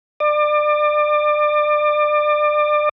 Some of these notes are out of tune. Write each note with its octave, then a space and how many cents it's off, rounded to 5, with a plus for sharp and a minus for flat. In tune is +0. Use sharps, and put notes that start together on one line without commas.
D5 +30